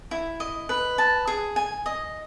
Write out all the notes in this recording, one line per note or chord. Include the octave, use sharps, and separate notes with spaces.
E4
D#5
B4
A5
G#4
G#5
D#5